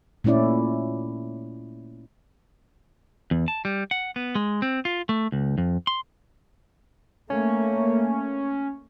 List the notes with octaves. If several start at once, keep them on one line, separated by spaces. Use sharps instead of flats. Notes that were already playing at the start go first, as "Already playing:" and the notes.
A#2 A3 C#4 E4 D5
E2
A5
G3
F#5
B3
G#3
C4
F4
A3
C#2
F2
C6
A3 A#3 C#4